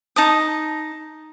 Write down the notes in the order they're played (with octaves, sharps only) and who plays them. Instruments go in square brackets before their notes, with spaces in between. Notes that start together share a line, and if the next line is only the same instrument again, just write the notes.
[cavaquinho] D#4 A5 D#6